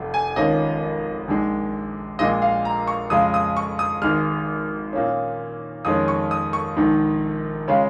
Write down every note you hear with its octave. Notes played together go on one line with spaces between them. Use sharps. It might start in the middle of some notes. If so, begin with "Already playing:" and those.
Already playing: F1 F2 F3
G#5
G#1 G#2 F3 C#4 F4 D#5
A#1 G#2 G#3
A#1 A#2 G#3 F4 D#5
F5
A#5
C#6
F2 C#3 G#3 F4 D#6
D#6
C#6
D#6
G#1 G#2 G#3 F6
A#2 A#3 C#4
F2 D#3 G#3 C#4 D#6
C#6
D#6
C#6
A#1 G#2 D#3
C#3 G#3 C#4 F4